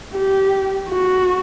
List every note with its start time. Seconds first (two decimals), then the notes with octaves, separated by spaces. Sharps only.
0.14 G4
0.89 F#4